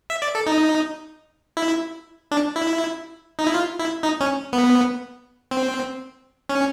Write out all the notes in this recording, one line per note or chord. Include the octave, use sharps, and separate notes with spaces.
E5
D5
A4
D#4
E4
D4
E4
D#4
E4
F4
E4
D#4
C#4
B3
C4
C#4